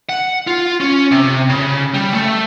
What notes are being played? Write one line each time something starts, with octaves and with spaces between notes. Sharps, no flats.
F#5
F4
C#4
C3
C#3
G3
A3